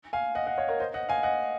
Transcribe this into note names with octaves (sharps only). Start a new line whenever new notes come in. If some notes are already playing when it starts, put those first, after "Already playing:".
F5 G#5
D#5 F#5
D#5 F#5
C#5 F5
A#4 C#5
C5 D#5
D#5 F#5
F5 G#5
D#5 F#5